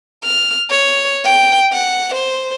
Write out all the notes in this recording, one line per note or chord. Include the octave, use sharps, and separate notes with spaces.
F6
C#5
G5
F#5
C5